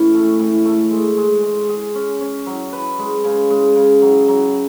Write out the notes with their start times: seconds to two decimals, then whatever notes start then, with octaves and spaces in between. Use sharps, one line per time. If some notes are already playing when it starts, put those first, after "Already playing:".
Already playing: A2 E3 C#4
0.14 A3
0.39 A2
0.65 A3
0.91 G#3
1.17 G#3
1.43 G#3
1.69 G#4
1.95 C#4
2.21 C#4
2.46 F#3
2.73 B4
2.99 G#3
3.24 C#3
3.50 G#3
3.76 C#3
4.02 F#3
4.28 F#3